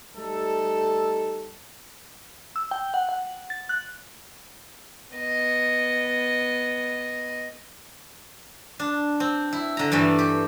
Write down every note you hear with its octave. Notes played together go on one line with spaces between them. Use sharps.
G3 A3 D#4 A4
E6
G5
F#5
F#5
A6
F#6
B3 D#5
D4
C4
E4
D3 A#5
G2 E3 G3 A3
G4